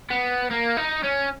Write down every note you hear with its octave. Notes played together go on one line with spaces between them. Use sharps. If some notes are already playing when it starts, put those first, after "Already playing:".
B3
A#3
D#4
C#4